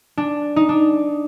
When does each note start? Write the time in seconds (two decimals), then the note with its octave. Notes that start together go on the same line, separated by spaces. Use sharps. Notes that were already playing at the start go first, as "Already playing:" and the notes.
0.17 D4
0.56 D#4
0.69 D4